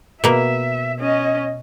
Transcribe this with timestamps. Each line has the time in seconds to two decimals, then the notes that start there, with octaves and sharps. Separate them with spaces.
0.24 B2 A#3 E5
1.00 C#4 D#5